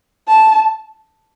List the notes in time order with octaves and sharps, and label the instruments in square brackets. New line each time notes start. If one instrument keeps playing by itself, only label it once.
[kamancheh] A5